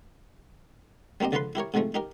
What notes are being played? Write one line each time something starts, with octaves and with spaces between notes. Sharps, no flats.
G3 A#3 C4 G4 D#5
C#2 D3 F3 F4 B4 C6
E4 G4 A#4 C#5
G#2 C3 F3 G#3 A3
D#4 G4 A#4